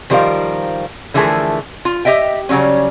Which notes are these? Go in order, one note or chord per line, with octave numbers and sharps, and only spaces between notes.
D#3 F3 G3 A#4 C5 F5
D3 E3 F3 A3 G#4 A#4
F4
G4 D#5 E5 G5
C#3 F#3 G3 C#4